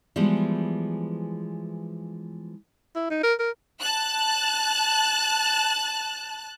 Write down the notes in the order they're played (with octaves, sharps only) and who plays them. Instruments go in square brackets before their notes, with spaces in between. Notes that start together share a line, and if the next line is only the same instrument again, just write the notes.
[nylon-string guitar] E3 F3 G3 G#3 B3
[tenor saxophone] E4
D#4
A#4
A#4
[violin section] A5 F#6